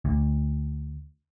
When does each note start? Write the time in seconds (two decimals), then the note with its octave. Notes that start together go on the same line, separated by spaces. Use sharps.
0.05 D2